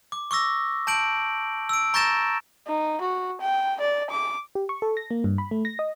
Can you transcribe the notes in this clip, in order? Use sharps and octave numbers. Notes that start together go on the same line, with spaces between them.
D6
C#6 D6 E6 A#6
A5 G6 D7 F#7
E6 D7
A#5 C#6 G6 A6 A#6 E7
D#4
F#4
G5
D5
D6
G4
C#6
A4
A#6
A#3
G2
B5
A3
A#6
D#5